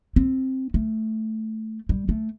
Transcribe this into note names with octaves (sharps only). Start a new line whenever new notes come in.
C4
A3
G3
A3